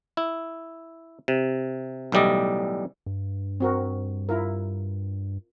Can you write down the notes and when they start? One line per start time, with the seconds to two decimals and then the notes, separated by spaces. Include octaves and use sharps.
0.17 E4
1.28 C3
2.12 B1 A2 E3 G3 D5 D#5
3.06 G2
3.60 C4 F#4 A#4
4.29 E4 F4 A#4